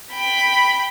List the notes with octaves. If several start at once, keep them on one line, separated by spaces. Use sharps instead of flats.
G5 B5